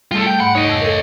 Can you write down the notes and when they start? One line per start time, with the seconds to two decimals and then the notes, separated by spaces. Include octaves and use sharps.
0.11 G3 A3 F4 A4
0.27 G5
0.40 G#2 F#5 B5
0.55 D#4 C#5 D#5
0.69 F2 E6
0.81 A4 A#4